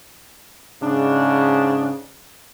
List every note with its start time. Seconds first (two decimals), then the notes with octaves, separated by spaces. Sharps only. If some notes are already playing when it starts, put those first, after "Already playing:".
0.81 G#2 C#3 D4